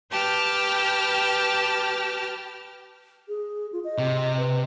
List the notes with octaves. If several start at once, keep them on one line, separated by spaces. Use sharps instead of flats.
G4 B4 G5 A5 F6
G#4
F4
D#5
C3
B4